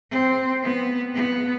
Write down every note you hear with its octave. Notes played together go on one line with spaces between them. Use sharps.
C4
B3
B3